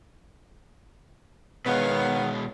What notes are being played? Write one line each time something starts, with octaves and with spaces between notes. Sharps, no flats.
B2 D#3 G#3 B3 C#5 F5